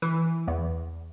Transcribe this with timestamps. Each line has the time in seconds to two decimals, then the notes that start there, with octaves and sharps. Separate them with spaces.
0.02 E3
0.48 E2